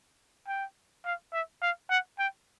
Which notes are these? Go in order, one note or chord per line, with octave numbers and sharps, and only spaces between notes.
G5
F5
E5
F5
F#5
G5